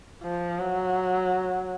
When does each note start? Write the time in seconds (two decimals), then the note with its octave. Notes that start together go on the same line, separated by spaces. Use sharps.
0.23 F3
0.60 F#3